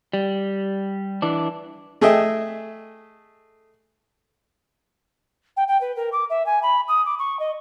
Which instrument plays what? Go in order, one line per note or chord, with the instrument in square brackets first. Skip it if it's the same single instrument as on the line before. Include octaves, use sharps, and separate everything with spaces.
[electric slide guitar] G3
E3 D4
[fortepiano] A3 G#4 D#5 E5 G5
[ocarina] G5
G5
B4
A#4
D6
E5
G#5
B5
D#6
D6
C#6
D#5